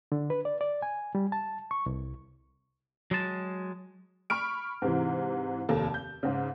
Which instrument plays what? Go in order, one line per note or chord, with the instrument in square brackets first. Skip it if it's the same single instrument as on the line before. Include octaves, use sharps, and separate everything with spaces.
[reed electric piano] D3
B4
D5
D5
G#5
G3
A5
C#6
C2
[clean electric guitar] F#3 G#3 A5
[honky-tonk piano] B5 C#6 F6 D7
G#2 C3 E3
F1 D#2 A#3 A4 A5
G6
G#2 C#3